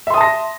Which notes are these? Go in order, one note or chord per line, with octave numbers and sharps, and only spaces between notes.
E5 A5 C6 D#6 A#6